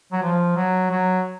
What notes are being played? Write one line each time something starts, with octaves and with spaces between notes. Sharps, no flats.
F#3
F3
F#3
F#3